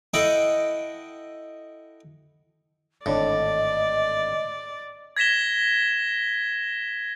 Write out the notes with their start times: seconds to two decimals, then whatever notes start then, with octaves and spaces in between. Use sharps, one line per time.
0.14 E4 A4 D#5 F#5 G5
3.06 G#1 A2 D3 D4 D5 D#5
5.17 G#6 A#6 B6 E7 G7